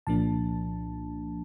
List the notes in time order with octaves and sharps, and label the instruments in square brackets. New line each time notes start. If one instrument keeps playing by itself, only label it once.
[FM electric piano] C2 A#2 F3 A#3 D4 A5